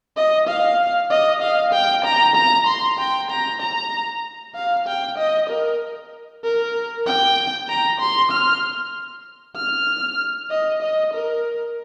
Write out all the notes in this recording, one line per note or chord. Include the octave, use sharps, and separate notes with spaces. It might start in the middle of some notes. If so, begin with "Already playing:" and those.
D#5
F5
D#5
F5
G5
A#5
A#5
C6
G5
A#5
A#5
F5
G5
D#5
A#4
A#4
G5
A#5
C6
F6
F6
D#5
D#5
A#4